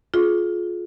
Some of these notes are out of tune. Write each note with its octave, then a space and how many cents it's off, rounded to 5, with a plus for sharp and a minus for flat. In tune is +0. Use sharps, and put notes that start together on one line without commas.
F4 +20 G#4 +35